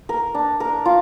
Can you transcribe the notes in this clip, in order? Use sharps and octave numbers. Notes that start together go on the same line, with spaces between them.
A#4
D4
A#4
F4